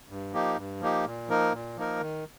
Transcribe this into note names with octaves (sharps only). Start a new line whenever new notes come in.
G2
F3 A#3 D#4 G4
G2
F3 A#3 D#4 G4
A#2
F3 A#3 D#4 A#4
A#2
F3 A#3 D#4 A#4
D#3